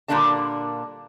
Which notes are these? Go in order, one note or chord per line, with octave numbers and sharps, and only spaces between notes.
A#2 D3 G3 A#3 D4 A5